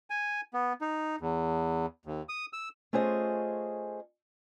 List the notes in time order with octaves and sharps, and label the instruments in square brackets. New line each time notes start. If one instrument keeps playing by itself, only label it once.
[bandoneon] G#5
B3
D#4
E2
D#2
D#6
E6
[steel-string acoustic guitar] A3 C#4 F4 G#4 C5 D#5